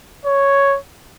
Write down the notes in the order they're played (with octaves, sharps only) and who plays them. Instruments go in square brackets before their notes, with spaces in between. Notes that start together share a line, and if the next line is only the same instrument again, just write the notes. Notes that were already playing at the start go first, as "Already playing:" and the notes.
[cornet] C#5